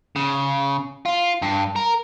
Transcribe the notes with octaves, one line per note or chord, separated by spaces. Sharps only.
C#3
F4
G2
A#4